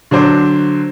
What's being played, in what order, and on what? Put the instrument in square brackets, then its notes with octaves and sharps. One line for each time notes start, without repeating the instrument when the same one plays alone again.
[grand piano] D3 F#3 D4 C5 D6